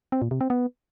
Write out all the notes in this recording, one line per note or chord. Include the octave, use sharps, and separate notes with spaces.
C4
A#2
C3
C4
B3